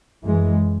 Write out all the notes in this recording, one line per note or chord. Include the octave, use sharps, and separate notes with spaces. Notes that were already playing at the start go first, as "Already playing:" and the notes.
F#2 E3 G#3